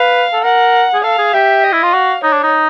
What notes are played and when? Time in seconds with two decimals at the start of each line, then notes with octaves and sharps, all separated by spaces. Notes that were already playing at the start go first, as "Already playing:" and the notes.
Already playing: B4 F5
0.33 A4
0.43 A#4 F#5
0.94 G#4
1.03 A4 F5
1.18 G#4
1.33 G4 E5
1.63 D#5
1.72 E4
1.83 F4
1.93 F#4 F5
2.23 D#4 C#5
2.33 D4
2.43 D#4